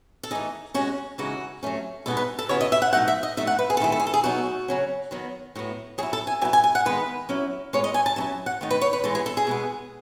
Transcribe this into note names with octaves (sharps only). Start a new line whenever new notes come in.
A4
E3 A3 D#4 G#4
B2 G#3 C#4 F#4
C#3 E3 G#3 D#4 F#4
F#3 A3 C#4
B2 G#3 B3 D#4 A4
B4
A4
C#3 F#3 B3 E4 C#5
D#5
E5
F#5
B2 F#3 A3 D#4 F#5
E5
D#5
F#3 A3 D#4 E5
F#5
B4
G#4
A4
D#3 A3 E4 G#4
A4
G#4
A4
G#4
B2 F#3 B3 D#4 F#4
C#3 F#3 C#4
D#3 F#3 B3
A2 F#3 B3
F#3 B3 E4 G#4
A4
G#5
F#3 B3 E4 G#5
G#5
G#5
F#5
D#3 G#3 B3 D#4 B4
F#3 C#4 E4
A2 G#3 B3 C#5
D#5
G#5
A5
F#3 C#4 E4 A5
F#5
D#3 A3 D#4
B4
C#5
B4
E3 G#3 B3 A4
G#4
A4
G#4
B2 G#3 B3